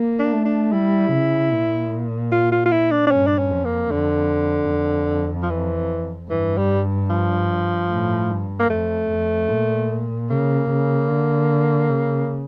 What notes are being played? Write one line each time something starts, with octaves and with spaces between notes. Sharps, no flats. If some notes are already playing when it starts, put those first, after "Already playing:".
Already playing: A#3
D4
A3
D4
G3 E4
C#3
A#2
F4
F4
F4
E4
D4
D4
G2 C#4
D4
C#4
F2
A#3
F2 D3
F2
F3
E3
G2 E3
G3
F3
A2
G2
A#3
F2 A3
F2
A#2
C#3 A#3
C#3
D3
C#3